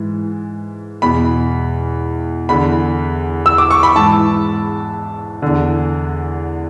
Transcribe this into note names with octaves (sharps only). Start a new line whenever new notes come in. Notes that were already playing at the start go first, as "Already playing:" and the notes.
Already playing: G#2 E3
E2 B2 B5
E2 D3 B5
E6
D6
C#6
B5
G#2 E3 A5
E2 D3